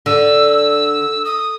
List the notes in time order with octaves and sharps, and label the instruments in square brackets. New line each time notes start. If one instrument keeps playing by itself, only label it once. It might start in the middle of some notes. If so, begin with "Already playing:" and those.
[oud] D3 [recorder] E6
[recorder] D#6